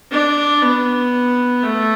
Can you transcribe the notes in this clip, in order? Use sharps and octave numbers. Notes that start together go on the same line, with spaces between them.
D4
B3
A3